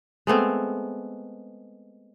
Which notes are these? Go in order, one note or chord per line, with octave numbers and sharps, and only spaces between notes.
G#3 A3 B3 C4